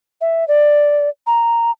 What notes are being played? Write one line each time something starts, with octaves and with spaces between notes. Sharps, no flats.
E5
D5
A#5